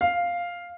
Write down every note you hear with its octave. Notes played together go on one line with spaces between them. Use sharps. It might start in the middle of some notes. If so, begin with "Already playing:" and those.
F5